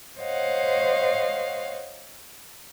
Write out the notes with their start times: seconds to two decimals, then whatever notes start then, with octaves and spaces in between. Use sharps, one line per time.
0.18 C5 C#5 D#5 F5 F#5